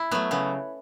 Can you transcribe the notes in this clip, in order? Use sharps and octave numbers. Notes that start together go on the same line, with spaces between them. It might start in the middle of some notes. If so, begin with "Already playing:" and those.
Already playing: E4
F#3 A3 B3
C#3 B3